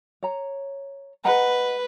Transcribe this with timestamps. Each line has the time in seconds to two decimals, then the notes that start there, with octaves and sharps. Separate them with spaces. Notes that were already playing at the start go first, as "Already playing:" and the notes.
0.23 C#5 A#5
1.25 B4 D#5 F#5 A#5